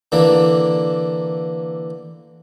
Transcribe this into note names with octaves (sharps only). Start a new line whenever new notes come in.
D3 E3 A#3 D4